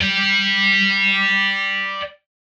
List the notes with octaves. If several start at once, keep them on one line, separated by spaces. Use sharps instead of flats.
D5 G5